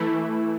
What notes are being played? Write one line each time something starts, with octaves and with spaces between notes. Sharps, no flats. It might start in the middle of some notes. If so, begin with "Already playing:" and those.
Already playing: E3 A3 E4